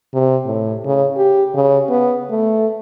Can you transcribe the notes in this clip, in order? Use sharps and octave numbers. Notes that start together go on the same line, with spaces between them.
C3
A2
C#3
G4
C#3
B3
A3